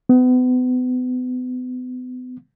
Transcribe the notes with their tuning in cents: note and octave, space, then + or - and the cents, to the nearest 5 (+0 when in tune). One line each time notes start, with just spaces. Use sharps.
B3 +35